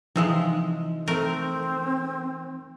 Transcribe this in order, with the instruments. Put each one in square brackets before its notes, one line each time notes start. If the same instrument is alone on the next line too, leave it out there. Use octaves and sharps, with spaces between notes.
[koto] C3 F3 G#3 [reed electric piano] E3 D#4 E6
[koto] A3 A#4 [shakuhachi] C4